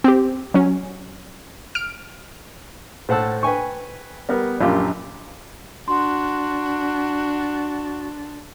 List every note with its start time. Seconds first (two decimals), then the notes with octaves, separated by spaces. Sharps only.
0.04 C4 G4
0.54 F#3 C#4
1.75 F6 D7
3.09 A2 C5 F#5 A5 E6
3.43 B4 G5 G#5 C#6
4.29 G3 B3 A#4
4.61 A#1 F#2 F4 G4
5.88 D4 F#4 C6